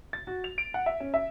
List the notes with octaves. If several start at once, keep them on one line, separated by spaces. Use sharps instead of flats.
A6
F#4
F7
D7
F#5
E5
C#4
E5